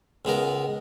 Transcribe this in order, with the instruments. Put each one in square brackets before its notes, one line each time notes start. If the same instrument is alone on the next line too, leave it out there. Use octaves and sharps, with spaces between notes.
[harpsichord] C#2 G#3 B3 A#4